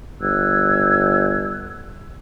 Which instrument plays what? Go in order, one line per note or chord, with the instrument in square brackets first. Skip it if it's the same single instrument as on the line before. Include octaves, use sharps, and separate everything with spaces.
[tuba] G1 [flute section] E6 F#6 G#6